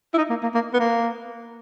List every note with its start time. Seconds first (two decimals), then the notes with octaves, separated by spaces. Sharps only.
0.14 E4
0.17 D#4
0.30 A#3
0.43 A#3
0.54 A#3
0.73 B3
0.79 A#3